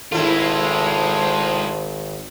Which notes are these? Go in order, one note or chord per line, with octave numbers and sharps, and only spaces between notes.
G#1 G#3 A3 E4 F4 C5